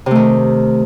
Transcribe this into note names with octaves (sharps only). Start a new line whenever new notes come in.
C3 D#3 A3